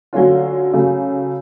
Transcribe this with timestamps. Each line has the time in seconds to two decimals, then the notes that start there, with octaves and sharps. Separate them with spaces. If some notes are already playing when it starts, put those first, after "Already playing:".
0.13 D3 F#3 A3 C#4 F4
0.73 C#3 F#3 A3